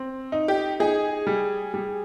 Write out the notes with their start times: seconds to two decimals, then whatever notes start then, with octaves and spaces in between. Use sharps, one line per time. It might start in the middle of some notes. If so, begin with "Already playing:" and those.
Already playing: C4
0.32 D#4
0.48 G4
0.80 D#4 G#4
1.27 G3
1.74 G3